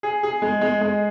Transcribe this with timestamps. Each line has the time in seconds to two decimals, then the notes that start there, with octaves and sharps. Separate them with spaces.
0.03 G#4
0.23 G#4
0.42 G#3
0.61 G#3
0.81 G#3